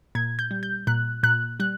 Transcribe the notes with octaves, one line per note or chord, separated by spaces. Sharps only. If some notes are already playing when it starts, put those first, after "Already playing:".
A#2 G#6
G6
G3
G6
A#2 F#6
A#2 F#6
G3 F#6